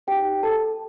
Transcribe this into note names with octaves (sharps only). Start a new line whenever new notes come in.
D#4 G4 C5 G5
A4 A5